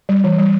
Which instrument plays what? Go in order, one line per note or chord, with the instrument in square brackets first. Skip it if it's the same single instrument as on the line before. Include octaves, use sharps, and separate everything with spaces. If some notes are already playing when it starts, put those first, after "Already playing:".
[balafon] G3
E3
G3